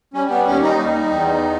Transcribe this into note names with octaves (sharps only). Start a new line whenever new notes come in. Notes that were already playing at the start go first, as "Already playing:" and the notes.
G3 C#4
B3
D#2 C#4
D#4
G3
E2